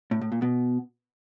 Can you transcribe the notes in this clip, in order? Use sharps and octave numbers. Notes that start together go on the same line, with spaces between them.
A2
A2
A#2
B2